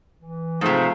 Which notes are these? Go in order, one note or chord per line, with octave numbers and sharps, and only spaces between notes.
E3
G#2 C3 F3 A3 G#4 C5 F5